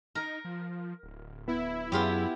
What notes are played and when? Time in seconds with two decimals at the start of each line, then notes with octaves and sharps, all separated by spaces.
0.15 D#4 A#4
0.45 F3
1.03 D1
1.48 B3 E4
1.92 F#2 B3 F4 G4 G#4